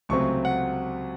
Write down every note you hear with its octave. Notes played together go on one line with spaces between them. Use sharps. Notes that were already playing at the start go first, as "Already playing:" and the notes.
C#2 C3 F#3 A3 C4 C#6
F#5